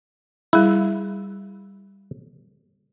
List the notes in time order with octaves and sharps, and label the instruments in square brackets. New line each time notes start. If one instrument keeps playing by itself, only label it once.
[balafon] G3 G#4 [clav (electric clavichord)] E4